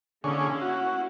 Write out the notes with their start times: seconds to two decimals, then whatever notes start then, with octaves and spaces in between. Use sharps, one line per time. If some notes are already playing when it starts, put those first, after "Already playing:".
0.24 D3 A#3 C#4 E4 G#4 C#5
0.61 F#4